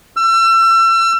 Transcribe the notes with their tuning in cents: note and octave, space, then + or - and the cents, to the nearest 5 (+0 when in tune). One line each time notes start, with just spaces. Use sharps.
E6 +35